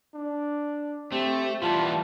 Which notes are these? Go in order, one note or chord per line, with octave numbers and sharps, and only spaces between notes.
D4
A3 C4 G4
E3 G3 B3 F4 A5